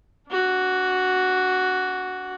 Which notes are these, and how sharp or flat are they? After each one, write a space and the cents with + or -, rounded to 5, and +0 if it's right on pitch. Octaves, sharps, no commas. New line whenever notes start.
D4 -35 F#4 +0